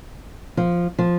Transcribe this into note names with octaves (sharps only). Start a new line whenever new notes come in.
F3
F3